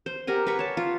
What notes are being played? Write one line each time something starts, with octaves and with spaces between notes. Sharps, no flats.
C5
G4 A#4 F#5 G#5
B4 A#5 B5 C#6
C#5 A5
F4